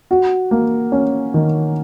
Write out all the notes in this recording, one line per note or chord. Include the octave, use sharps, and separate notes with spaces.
F#4
A#3
C#4
D#3